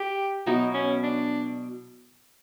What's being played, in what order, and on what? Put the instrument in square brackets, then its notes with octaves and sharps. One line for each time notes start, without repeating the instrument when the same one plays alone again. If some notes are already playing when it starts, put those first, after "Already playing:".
Already playing: [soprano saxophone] G4
[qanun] B2 F#3 B3 E4 [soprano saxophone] D#4
[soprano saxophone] C#4
D4